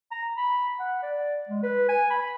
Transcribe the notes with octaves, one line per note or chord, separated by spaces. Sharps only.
A#5
B5
F#5
D5
G#3
B4
G#5
B5